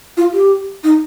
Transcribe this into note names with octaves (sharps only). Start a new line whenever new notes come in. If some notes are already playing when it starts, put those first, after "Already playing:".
F4
G4
D#4